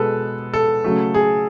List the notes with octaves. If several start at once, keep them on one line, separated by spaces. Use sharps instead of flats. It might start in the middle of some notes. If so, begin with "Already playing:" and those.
Already playing: B2 G#3 A4 B4
A4
C#3 F#3 A3
G#4